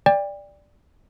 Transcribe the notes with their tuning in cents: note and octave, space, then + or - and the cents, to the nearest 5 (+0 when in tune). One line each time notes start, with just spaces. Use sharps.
D5 +0 G5 +35